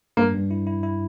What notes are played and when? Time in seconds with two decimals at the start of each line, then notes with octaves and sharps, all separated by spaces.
0.17 G2 A#3
0.34 G2
0.51 E4
0.67 E4
0.83 E4